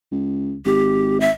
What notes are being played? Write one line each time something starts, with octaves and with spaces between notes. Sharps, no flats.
C#2
G#1 G4
E5